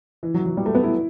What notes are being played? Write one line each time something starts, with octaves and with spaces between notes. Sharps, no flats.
E3
F#3
F#3
G3
A3
B3
E4